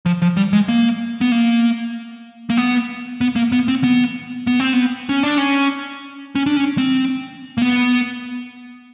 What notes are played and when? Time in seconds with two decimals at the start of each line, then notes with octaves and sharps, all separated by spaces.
0.06 F3
0.22 F3
0.37 G3
0.53 G#3
0.69 A#3
1.21 B3
1.32 A#3
2.50 A#3
2.57 B3
3.21 B3
3.36 A#3
3.52 B3
3.68 C4
3.84 B3
4.47 B3
4.60 C4
4.73 B3
5.09 C#4
5.23 D4
5.38 C#4
6.35 C#4
6.46 D4
6.57 C#4
6.78 C4
7.58 A#3
7.62 B3